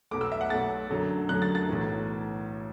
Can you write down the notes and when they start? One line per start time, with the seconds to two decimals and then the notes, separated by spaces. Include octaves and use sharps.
0.11 B1 B2 A3 D6
0.21 E6
0.32 E5
0.41 F#5
0.50 B1 B2 A3 A6
0.89 F#2 D3 F#3 A3
1.29 F#2 D3 F#3 A3 F#6
1.42 A6
1.55 A6
1.69 B1 A2 E3